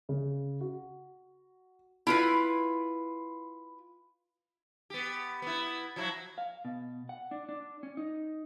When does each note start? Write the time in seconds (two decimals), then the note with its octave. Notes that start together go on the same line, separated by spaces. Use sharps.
0.09 C#3
0.61 F#4
2.07 E4 F4 B4
4.90 B3 G4
5.42 B3 E4
5.96 F3 F#3 E4
6.38 F5
6.65 B2
7.09 F#5
7.31 D4
7.49 D4
7.83 C#4
7.97 D#4